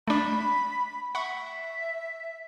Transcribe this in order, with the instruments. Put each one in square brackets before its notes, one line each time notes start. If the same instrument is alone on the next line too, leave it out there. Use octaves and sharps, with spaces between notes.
[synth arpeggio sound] A3 D4 [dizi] B5
[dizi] E5 [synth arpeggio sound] F#5 B5 C#6